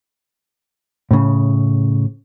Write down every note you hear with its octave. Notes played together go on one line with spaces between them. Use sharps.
A2 C#3